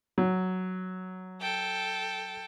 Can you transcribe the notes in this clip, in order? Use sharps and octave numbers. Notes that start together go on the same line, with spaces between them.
F#3
A4 G5